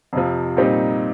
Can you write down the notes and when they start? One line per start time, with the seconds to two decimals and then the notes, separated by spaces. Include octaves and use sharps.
0.13 F2 C3 F3
0.57 A#2 G3 C4 D#4